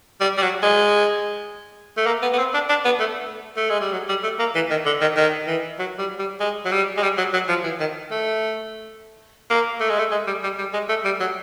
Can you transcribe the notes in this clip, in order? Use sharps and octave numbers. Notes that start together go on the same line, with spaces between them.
G3
G3
F#3
G#3
A3
A#3
B3
B3
C4
D4
D4
B3
A3
A3
G#3
G3
F#3
G3
A3
A#3
E3
D#3
D3
D#3
D#3
E3
F#3
G3
G3
G#3
F#3
G3
G#3
G3
F#3
F#3
F3
E3
D#3
A3
A#3
A3
G#3
A3
G#3
G3
G3
G3
G#3
A3
G3
F#3